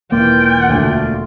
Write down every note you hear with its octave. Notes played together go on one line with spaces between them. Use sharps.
E1 E3 A#3 F4 D5 G5
D2